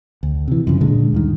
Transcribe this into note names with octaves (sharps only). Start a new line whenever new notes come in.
D2
C3 E3
F#2 C#3 F3
A#2 D3 G#3
D2 G2 D#3